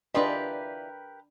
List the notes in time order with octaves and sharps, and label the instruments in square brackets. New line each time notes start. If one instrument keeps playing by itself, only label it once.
[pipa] E3 F4 D5 [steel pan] D4 D#5 [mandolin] G4 A#4 B4